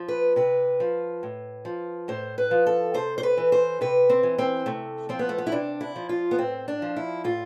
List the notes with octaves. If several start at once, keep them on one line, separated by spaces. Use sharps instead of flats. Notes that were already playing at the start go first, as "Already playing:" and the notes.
Already playing: F3
B4
C3 B4
F3
A2
F3
A2 C5
B4
F3
A4
C3 C5
C5
B4
E3
C5
C3 B4
C4
E3
C4
C3 A3
F3 C4
B3
A3
B3
E4
C3 D4
E4
F3
F4
B3
A2 C4
D4
F3
E4
A2 F4